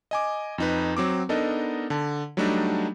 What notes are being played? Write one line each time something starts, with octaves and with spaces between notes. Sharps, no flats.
D#5 G#5 D6
F2 D#4 B4
F#3 C4 D6
B3 D4 D#4 A4 A#4 D#5
D3 A5
F#3 G3 A3 D4 D#4